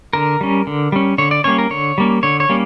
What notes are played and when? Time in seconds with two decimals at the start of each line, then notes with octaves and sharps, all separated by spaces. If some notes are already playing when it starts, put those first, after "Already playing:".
0.13 D3 A#4
0.41 G3 C#4
0.67 D3
0.92 G3 C#4
1.18 D3 C#5
1.31 D5
1.44 G3 A#3 C#4 C#5
1.58 A#4
1.70 D3 C#5
1.98 G3 A#3 C#4
2.23 D3 C#5
2.40 C#5
2.49 G3 A#3 C#4